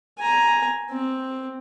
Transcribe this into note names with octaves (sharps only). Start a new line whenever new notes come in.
G#5 A#5
C4